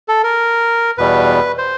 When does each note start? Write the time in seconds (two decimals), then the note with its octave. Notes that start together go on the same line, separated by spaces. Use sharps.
0.08 A4
0.23 A#4
0.98 E2 B2 G3 B4
1.58 C5